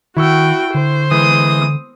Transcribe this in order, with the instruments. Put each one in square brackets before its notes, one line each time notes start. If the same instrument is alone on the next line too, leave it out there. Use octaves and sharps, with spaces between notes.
[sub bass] D#3 [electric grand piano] E4 C#6 E6 [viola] F#4 G5
[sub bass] D3 [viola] C5
[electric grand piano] E3 G#3 [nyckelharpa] D#6